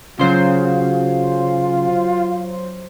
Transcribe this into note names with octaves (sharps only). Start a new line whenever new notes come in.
C#3 F#3 F4 C5 C6